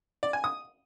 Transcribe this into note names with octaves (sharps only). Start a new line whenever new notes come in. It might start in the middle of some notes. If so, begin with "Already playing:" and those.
D5
G#5
D#6